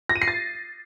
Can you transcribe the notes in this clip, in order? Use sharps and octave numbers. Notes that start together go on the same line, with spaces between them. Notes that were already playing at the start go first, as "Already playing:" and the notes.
A#6
D#7
C7
A6